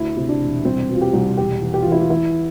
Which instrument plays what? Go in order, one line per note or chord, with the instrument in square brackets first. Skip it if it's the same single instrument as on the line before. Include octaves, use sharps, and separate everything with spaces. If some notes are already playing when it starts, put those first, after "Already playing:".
Already playing: [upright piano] D2 E4
C3
D4
E1
C2 C4
B2
F4
G4
C2
E1 G4
E3
G4
E3 F4
E4
F4
E3 E4